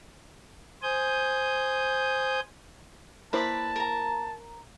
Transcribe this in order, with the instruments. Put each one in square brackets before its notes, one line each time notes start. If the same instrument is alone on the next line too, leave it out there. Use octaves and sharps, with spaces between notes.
[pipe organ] C5 G#5 D#6 G6
[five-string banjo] A#3 E4 C5 [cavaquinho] B4 D5 B5 [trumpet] A5
[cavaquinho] A#4 A#5